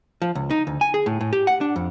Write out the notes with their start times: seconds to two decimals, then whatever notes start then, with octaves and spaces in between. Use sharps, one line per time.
0.22 F3
0.35 C#2
0.50 D#4
0.67 D2
0.81 G#5
0.94 G#4
1.06 A2
1.21 A2
1.33 G4
1.47 F#5
1.61 D4
1.76 F2